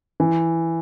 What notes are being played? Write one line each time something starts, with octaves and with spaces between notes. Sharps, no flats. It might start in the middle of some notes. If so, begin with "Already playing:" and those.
E3